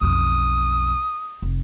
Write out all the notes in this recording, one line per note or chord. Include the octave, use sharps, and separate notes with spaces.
B1 F2 D#6
F1